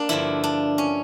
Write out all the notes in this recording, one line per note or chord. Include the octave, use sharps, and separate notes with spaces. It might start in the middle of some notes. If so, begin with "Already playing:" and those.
Already playing: A#3 D4
G2 D3 F3 E4
D4
C#4